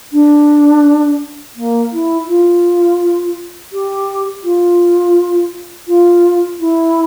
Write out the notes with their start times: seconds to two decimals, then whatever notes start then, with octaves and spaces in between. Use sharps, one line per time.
0.12 D4
1.56 A#3
1.92 E4
2.28 F4
3.72 G4
4.43 F4
5.87 F4
6.59 E4